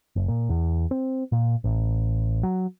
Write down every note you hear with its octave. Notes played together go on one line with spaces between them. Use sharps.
F#1
A#2
E2
C4
A#2
A1
F#3